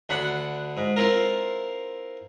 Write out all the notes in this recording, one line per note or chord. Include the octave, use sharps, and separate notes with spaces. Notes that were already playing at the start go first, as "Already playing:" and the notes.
D2 D4 F#5 B5
G#2
C4 E4 F4 A#4